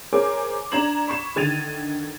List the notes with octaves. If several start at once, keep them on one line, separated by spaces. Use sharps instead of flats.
G#4 A#4 C5 C#5 G#5 D6
D4 A#5 G#6 E7 F#7
B5 C#6 E7
D3 D#3 G#6 A6 D#7 F7